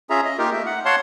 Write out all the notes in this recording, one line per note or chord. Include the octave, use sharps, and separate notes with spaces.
C#4 F4 G#4 E5 A#5
D#5
A#3 D#4 F4 G4 A#4
A3 E5
F#5
C#5 F5 F#5 A5 C6